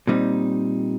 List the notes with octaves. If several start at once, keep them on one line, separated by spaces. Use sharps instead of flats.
A#2 G3 C4 D#4